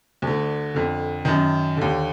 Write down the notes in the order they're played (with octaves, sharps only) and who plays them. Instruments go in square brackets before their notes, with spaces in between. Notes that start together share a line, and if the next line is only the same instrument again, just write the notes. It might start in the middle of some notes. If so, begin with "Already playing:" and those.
[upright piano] D2 D3
F2 D3
F#2 D#3
D#2 D3